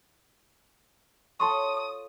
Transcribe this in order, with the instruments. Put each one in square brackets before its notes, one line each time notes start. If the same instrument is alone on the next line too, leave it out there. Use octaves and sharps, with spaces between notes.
[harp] F4 A4 C#5 [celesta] A5 C6 C#6 [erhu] D#6